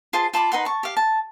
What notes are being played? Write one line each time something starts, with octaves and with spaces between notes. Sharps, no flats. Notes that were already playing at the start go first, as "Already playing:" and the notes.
F4 G#4 C5 A5
F4 A5 B5 D6
D#4 B4 F#5 C6
A5 C#6
G4 F5
A5